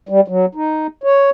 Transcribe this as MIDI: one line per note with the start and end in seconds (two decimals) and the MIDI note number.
0.09 0.21 55
0.28 0.46 54
0.55 0.87 63
1.04 1.30 73